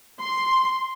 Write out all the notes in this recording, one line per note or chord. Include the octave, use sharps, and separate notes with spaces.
C6